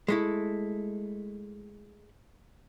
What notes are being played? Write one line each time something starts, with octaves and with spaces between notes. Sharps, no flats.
G#3 A3 E4